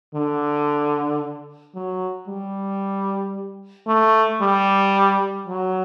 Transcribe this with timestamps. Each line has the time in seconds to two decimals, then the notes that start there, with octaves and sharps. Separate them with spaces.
0.15 D3
1.75 F#3
2.28 G3
3.87 A3
4.41 G3
5.47 F#3